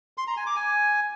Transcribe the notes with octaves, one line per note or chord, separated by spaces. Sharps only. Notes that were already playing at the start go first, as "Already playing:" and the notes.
C6
A#5
G#5
D6
G#5